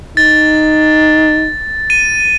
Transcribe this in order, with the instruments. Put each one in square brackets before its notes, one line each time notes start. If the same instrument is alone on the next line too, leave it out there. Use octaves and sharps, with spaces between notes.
[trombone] D#4 [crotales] A6
[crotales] D#7